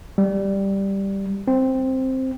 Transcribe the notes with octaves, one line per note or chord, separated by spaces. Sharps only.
G3
C4